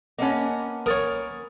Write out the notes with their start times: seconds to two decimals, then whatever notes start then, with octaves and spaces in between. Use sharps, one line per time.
0.18 A#3 B3 C#4 D#5 A5
0.86 A#4 C#5 D#6 A6